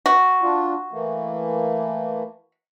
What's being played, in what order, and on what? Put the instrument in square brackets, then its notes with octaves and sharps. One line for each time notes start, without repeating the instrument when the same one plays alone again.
[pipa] F#4
[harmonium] D4 F4
E3 A3 A#3